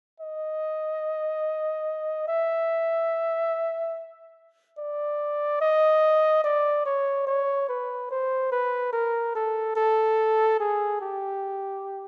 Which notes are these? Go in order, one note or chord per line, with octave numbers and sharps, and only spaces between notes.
D#5
E5
D5
D#5
D5
C#5
C#5
B4
C5
B4
A#4
A4
A4
G#4
G4